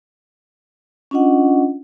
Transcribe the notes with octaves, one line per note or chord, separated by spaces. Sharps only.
C#4 D4 F4 D#5 F#5